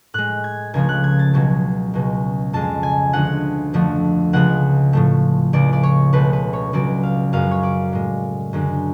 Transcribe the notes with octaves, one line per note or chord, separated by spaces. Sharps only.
A2 G#3 F#6
G#6
C#2 C#3 F3 A3 G#6
F#6
G#6
A6
C#2 B2 F#3 G#6
C#2 B2 G#3
F2 C#3 G#3 A5
G#5
D2 D3 F3 G#3 F#5
F2 D3 F3 A3
C#2 C#3 F3 G#3 F#5
A2 F3 A3
C#2 C#3 F3 D5
D5
C#5
C#2 B2 A3 B4
B4
C#5
C#2 C#3 F#3 D5
F5
F#2 C#3 G#3 F5
C#5
D5
A2 G#3
F#2 D3 G#3